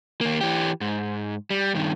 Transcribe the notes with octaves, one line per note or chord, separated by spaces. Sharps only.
D#2 A#3
E3 G4
G#2
G3
G2 D#3